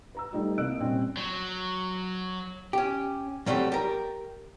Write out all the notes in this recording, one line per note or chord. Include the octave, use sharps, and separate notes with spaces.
B4 A#5 E6
G3 A3 D#4 F4
C2 A#3 D#5 E6 F#6 D7
A#2 G3 C4 C#4
F#3
C#4 G4
F#3 G3 A3 C4 G4
G4 A#4